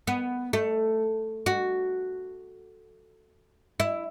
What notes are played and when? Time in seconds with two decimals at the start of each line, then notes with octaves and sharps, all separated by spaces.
0.07 B3
0.53 A3
1.46 F#4
3.80 E4